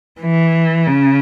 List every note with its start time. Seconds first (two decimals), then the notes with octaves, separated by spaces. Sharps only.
0.21 E3
0.87 C#3